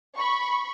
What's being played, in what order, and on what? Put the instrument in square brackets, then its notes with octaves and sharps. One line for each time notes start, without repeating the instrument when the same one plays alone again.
[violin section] B5 C#6